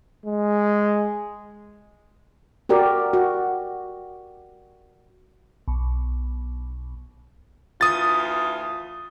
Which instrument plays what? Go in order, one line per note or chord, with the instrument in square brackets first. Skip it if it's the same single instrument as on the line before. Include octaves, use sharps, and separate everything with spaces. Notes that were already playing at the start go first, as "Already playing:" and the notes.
[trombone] G#3
[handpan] F#4 G4 A#4 D5
F#4
[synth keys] B1
[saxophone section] D2 E3 F4 [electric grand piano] D#6 A6